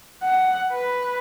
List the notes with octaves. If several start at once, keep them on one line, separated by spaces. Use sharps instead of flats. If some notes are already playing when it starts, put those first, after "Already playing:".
F#5
B4